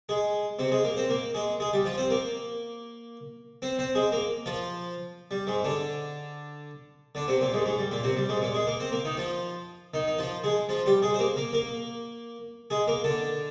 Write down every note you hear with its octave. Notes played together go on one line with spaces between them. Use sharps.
G#3 G#4
C3 C4
G#3 G#4
A#3 A#4
C4 C5
A#3 A#4
G#3 G#4
G#3 G#4
G3 G4
F3 F4
C4 C5
A#3 A#4
C4 C5
C4 C5
G#3 G#4
A#3 A#4
F3 F4
G3
G#2 G#3
D3 D4
D3 D4
C3 C4
A#2 A#3
G#2 G#3
G#2 G#3
G3
A#2 A#3
C3 C4
G3
G#2 G#3
A#2 A#3
G#3 G#4
A#3 A#4
C4 C5
A#3 A#4
D#3 D#4
F3 F4
D#3 D#4
D#4
F3 F4
G#3 G#4
F3 F4
G3 G4
G#3 G#4
C5
A#3 A#4
A#3 A#4
A#3 A#4
G#3 G#4
A#3 A#4
D3 D4